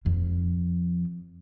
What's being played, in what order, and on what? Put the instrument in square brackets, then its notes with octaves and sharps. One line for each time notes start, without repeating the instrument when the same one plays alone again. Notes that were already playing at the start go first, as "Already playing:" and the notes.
[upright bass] F2 F3